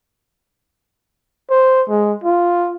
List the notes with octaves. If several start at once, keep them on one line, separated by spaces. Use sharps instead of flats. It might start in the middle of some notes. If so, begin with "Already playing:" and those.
C5
G#3
F4